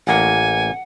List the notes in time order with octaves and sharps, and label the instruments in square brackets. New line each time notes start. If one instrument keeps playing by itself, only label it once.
[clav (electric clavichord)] A1 A#3 [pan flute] F#5 [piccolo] G#5